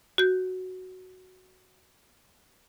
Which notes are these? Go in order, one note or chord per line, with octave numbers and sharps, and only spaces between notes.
F#4 G6